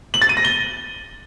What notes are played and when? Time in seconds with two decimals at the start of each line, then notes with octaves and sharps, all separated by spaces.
0.14 F#7
0.22 A6
0.29 D#7
0.37 A#6
0.45 G7